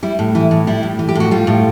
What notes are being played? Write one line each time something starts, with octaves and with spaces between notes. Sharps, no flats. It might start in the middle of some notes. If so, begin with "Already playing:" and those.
G3 E4
A2
E3 E4
A2
G3 E4
A2
E3
G4
A2 F#4
G3 F4
A2